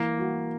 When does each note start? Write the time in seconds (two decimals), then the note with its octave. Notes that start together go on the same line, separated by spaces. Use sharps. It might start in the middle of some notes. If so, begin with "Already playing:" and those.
Already playing: E3 A#3
0.19 F#4